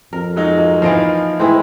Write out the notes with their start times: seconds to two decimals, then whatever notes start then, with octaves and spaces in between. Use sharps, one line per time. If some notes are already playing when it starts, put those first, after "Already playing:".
0.13 F2 A#4
0.36 F#3 G#3 D#4
0.58 A#3
0.82 E3 F3 D#4 D#5 F5 D7
1.39 A2 E3 G#3 C4 E4